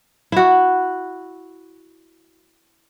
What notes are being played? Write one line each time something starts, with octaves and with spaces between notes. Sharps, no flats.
E4 F#4